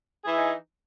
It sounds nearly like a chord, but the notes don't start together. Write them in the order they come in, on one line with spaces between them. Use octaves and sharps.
G#4 E3 E4 D#4